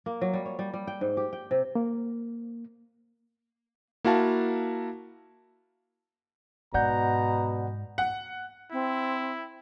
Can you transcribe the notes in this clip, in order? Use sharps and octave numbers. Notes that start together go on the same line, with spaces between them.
A#3
F#3
G3
C#5
G3
G3
G5
G#2
G4
G5
C3
A#3
A#3 E4 F#4 F5 A5
G#2 B2 D5 F#5 A#5 G6
F#5
C4 E4